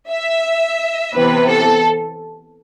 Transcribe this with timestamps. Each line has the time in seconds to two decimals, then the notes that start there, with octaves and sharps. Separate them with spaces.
0.11 E5
1.14 C3 E3 B3 B4
1.48 A4